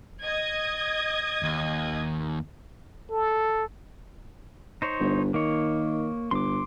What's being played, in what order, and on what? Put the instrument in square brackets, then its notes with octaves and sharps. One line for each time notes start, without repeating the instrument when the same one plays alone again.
[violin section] D#5 D#6 G#6
[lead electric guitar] D#2
[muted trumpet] A4
[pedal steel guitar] D#4 C5 C#5
[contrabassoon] G1
[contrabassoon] D#3 [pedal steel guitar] A#3 C#5
[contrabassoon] G1 [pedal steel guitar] C6 D6